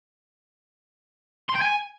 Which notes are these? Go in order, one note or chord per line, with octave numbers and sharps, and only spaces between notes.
C6
G5
G#5